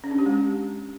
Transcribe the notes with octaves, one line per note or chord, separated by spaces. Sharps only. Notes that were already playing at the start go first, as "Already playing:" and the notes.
C#4
D4
G4
G#3